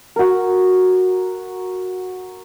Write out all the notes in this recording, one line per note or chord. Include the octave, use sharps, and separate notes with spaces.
F#4 A#4